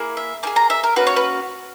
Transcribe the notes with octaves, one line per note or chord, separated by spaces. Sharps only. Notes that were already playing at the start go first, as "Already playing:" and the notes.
Already playing: A#3 E4 G#4
E5
A#3 E4 G#4 G#5
A#5
E5
A#4
A#3 C#4 F#4 B4
C#5
B4